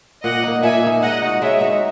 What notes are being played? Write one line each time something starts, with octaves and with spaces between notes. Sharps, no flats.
A#2 D#5 F#5
A#3 D#4
A#2 E5 G#5
A#3 D#4
G#3 D#5 F#5
D#4 F#4
G#3 C#5 E5
D#4 F#4